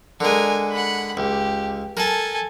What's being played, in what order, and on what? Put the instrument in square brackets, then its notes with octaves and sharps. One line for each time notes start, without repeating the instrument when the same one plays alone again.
[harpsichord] D3 G#3 [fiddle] A#4 G#5
[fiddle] F#5 B5
[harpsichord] C#2 [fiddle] G4
[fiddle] A4 G#5 [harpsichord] A#4 A5